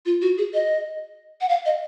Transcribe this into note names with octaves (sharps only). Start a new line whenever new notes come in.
F4
F#4
G#4
D#5
F#5
F5
D#5